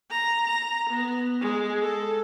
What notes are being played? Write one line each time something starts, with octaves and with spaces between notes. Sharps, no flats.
A#5
A#5
B3
G#3
A4